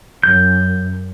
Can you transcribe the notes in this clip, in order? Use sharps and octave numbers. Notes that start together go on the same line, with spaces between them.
F#2 G6